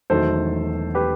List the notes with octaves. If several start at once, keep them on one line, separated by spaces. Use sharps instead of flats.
E1 E2 D#3 F#3 A3 A4 C5
G4 B4